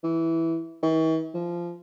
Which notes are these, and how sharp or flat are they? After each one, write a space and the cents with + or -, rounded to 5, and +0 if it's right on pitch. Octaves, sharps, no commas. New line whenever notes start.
E3 -5
E3 -45
F3 -15